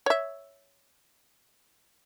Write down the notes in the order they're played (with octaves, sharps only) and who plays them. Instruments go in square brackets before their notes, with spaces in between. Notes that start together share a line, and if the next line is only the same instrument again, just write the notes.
[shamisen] C#5 E5